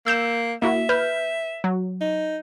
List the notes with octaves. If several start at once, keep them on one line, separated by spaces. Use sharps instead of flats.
A#3 E6 G6 E7
A#3 E4 F#4 E5
B4 F6 G6
F#3
D#4